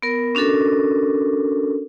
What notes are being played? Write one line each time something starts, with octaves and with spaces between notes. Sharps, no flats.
B3 A#4
C#4 D4 F#4 A4 A#4